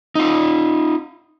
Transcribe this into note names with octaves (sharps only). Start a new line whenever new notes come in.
D#4 F4